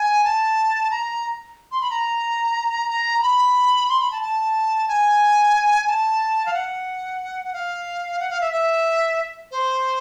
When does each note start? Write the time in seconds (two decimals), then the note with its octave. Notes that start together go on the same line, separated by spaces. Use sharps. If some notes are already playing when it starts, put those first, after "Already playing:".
Already playing: G#5
0.25 A5
0.91 A#5
1.72 C6
1.81 B5
1.90 A#5
2.89 A#5
3.19 A#5
3.23 B5
3.89 C6
4.00 B5
4.11 A5
4.22 A5
4.88 G#5
5.87 A5
6.46 F5
6.54 F#5
7.44 F#5
7.53 F5
8.20 F#5
8.30 F5
8.41 E5
8.52 E5
9.51 C5